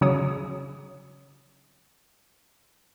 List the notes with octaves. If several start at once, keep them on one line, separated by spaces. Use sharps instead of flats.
C#3 F#3 C#5 D#6